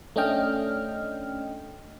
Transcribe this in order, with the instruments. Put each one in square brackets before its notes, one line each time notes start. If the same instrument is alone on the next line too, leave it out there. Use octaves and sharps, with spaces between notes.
[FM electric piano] A3 C#4 D4 D#5 G5 F6